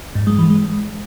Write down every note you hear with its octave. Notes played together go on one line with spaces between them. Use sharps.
G#2
G#3
E3
G#3